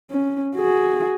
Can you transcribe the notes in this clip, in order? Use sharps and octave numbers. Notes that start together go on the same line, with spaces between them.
C#4
F#4 G#4